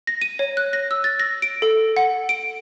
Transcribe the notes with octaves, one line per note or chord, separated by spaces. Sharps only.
A#6
D#7
C#5
F#6
A#6
E6
A6
A#6
D7
A4
F#5
D7